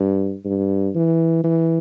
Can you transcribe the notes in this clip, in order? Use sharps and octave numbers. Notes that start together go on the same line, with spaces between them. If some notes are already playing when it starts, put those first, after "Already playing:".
Already playing: G2
G2
E3
E3